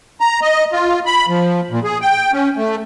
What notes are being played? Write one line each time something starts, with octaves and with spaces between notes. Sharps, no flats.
A#5
D#5
F4
B5
F3
A#2
G#4
G5
C#4
A3